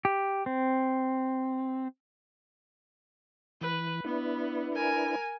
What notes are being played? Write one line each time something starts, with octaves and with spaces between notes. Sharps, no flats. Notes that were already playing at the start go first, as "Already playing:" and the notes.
G4
C4
E3 B4
B3 D4 E4 B4
A#4 G#5